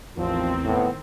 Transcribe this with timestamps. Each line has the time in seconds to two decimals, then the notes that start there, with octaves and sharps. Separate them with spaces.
0.17 A1 E2 D#3 F3 C4
0.65 A2 B3